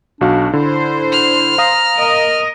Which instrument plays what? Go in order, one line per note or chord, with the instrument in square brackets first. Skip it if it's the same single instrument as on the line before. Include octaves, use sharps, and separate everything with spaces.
[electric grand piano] B1 F#4 F5 [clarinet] D4
[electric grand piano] D3 [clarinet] E4 [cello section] C5
[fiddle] F6
[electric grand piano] F5 D#6 [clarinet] A#5
[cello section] A#4 D#5